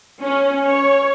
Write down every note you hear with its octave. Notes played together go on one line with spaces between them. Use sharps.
C#4
C#5